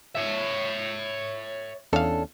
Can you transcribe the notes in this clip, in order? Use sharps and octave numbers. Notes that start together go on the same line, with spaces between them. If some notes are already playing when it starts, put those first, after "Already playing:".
C#5 E5
E2 C#4 D4 A4 F5